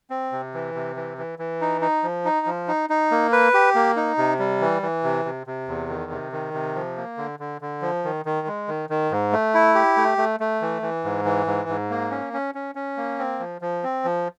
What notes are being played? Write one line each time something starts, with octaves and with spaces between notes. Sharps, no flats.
C4
C3
E3
C3
E3
E3
E3
D#4
D#4
F3
D#4
F3
D#4
D#4
A#3
B4
G4
A#3
D#4
C3
G3
E3
E3
C3
C3
C3
E2
D#3
C3
D#3
C3
F3
A#3
D3
D3
D3
F3
D#3
D#3
G#3
D#3
D#3
G#2
A3
E4
G4
A3
A3
A3
E3
E3
G#2
E3
G#2
G#2
A#3
C#4
C#4
C#4
C#4
A#3
C4
F3
F3
C4
F3